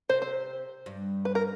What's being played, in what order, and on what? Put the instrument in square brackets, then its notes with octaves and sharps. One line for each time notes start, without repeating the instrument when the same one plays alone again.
[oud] C3 [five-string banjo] C5
[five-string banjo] C5
[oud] G2
[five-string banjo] B4
A#4